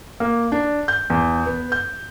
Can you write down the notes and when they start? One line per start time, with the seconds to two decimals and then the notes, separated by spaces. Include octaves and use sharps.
0.20 A#3
0.52 D4
0.88 G6
1.10 E2
1.46 B3
1.72 G6